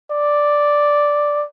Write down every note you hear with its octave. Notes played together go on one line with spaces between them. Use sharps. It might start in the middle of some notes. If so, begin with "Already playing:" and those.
D5